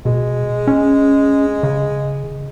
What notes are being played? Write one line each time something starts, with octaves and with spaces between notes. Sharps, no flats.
B2 G#3
C#4
C#3